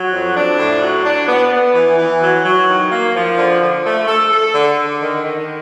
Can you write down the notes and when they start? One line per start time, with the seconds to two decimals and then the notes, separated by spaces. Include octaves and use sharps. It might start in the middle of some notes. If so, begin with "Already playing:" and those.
Already playing: F#3
0.12 F2
0.36 D4
0.58 A2
0.81 F#3
1.04 D4
1.28 B3
1.52 B3
1.74 E3
1.98 E3
2.22 F#3
2.44 F#3
2.68 D#3
2.91 A#3
3.15 F3
3.38 D3
3.61 D3
3.85 A3
4.08 A4
4.32 A4
4.54 D3
4.77 D3
5.01 D#3
5.25 D#3